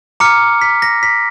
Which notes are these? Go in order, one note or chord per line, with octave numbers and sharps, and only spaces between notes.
A#5 D6 F6 C#7
B6
A#6
B6